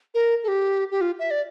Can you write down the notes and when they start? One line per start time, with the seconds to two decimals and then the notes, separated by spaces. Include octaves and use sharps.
0.14 A#4
0.44 A4
0.48 G4
0.91 G4
1.01 F4
1.19 E5
1.31 D5